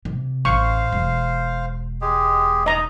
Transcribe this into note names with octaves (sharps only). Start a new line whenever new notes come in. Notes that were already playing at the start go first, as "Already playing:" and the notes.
C3
A1 C5 F5 C#6
E1
G#3 G4 G#4
D#4 D#5 A#5 D#6